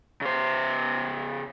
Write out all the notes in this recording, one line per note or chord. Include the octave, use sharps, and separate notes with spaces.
C#3 C5